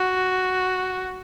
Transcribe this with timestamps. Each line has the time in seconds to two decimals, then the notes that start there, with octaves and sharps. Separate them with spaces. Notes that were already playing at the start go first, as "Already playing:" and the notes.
Already playing: F#4